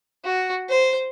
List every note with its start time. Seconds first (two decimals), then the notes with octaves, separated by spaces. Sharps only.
0.24 F#4
0.69 C5